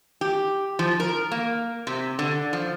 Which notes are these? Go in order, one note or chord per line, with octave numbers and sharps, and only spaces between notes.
G4
F3
A#4
A#3
C3
D3
F3